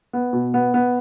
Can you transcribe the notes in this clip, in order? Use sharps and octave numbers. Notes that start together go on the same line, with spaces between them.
B3
B2
B3
B3